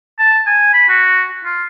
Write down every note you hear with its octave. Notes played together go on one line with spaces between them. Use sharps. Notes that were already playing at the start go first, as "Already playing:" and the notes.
A5
G#5
B5
F#4
F4